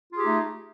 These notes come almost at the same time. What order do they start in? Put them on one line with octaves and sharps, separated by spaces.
F4 G#4 G4 D#4 A3